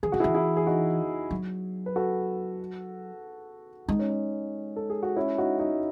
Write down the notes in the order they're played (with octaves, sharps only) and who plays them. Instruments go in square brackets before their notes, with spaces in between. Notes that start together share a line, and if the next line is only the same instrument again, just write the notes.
[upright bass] E3 [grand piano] G#4
[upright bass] D#3 [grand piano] F#4
[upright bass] E3 [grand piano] E4 G#4
[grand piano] E4 G#4
G#4
D#4 F#4
[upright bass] F#3
[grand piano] B4
F#4 A4
[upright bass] G#3 [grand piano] D#4
[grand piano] C#4
D#4
A4
G#4
F#4
C#4 E4
D#4 F#4
D#4 F#4